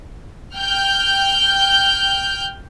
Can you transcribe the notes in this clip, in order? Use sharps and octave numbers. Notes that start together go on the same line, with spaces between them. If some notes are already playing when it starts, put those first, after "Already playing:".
G5 F6 G6